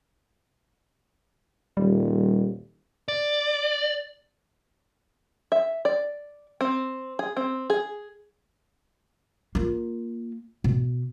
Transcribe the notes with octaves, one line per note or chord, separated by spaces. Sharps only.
D#1 G3
D5
E5
D5
C4
G#4
C4
G#4
A#3 F4
B2